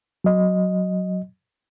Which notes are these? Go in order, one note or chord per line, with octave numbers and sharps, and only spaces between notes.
F#3 D#5